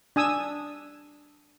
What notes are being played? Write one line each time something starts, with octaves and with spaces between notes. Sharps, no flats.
D4 G#5 D#6 E6